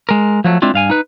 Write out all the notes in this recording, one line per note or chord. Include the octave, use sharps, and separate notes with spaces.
G#3 A#4
F3 F#3 A3
G#3 C4 D4 E4 F4
G2 F5 G#5
D#4 B4